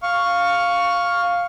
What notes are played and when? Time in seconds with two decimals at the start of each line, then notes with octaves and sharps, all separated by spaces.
0.03 F5 C#6